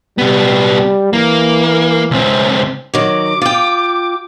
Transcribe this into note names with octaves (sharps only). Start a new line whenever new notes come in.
C3 G3 B3
E3 A#3
C#2 C4
D#3 F#3 D6
F4 G5